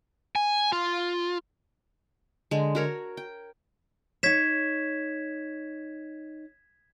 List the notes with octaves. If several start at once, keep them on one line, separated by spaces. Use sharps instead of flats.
G#5
F4
D3 G#3
F#4 A#4 C#5
G5
D#4 C#5 G#6 B6 E7